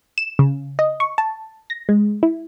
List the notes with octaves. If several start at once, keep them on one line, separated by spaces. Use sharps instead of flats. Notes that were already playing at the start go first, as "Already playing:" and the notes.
E7
C#3
D#5
C#6
A5
A#6
G#3
E4